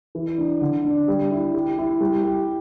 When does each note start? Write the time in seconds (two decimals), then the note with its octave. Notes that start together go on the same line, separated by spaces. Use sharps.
0.15 E3
0.38 D4
0.61 D3
0.84 D4
1.08 G3
1.31 E4
1.54 G4
1.78 E4
2.00 G3
2.24 G4